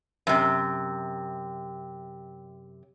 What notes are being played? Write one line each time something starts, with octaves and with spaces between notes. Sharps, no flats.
F#2 C3